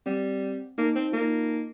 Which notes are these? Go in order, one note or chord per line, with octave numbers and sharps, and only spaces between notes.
G3 C4
A#3 D#4
C4
A#3 F4
D#4